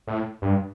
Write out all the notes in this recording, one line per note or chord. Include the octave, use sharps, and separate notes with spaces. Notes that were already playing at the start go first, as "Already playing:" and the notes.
A2
G2